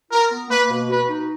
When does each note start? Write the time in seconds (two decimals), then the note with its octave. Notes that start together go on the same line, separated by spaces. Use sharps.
0.12 F4 A#4
0.30 B3
0.50 A#3 B4
0.70 B2
0.89 F#4 B4
1.09 D#4